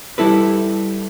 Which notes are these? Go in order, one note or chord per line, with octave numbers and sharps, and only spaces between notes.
G3 E4 A4 B4